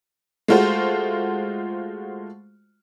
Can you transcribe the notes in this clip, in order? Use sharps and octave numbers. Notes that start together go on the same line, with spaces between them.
G#3 A3 F4 F#4 C5